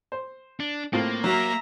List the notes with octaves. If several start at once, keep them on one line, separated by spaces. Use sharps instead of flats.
C5
D4
A2 A#3 C4 F4
F#3 E5 A#5